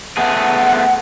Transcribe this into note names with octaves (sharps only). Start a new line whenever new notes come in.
A3 B3 G#4 F#5